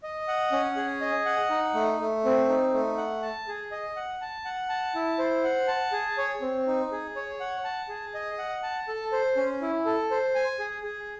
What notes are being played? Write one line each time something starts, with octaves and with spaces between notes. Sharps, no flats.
D#5
F#5
C#4
G#4
D#5
F#5
D#4
A3
A3
C4
D#4
A3
F#5
A5
G#4
D#5
F#5
A5
F#5
A5
E4
C5
F#5
A5
G#4
C#5
C4
D#4
G#4
C#5
F#5
A5
G#4
D#5
F#5
A5
A4
C5
C#4
E4
A4
C5
G#5
G#4
G#4